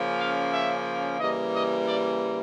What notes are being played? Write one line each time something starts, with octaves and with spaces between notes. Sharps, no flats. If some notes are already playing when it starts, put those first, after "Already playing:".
Already playing: C#3 F3 A#3 C#4
F5
E5
C#3 E3 G3 A#3 D#5
D#5
D5